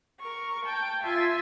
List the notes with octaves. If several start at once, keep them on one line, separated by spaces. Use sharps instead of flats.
A#4 C#6
G5 A5
F4 E5 G#5 A6